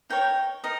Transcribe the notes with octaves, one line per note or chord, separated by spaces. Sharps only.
D#4 A#4 C#5 G5
D#4 A#4 D#5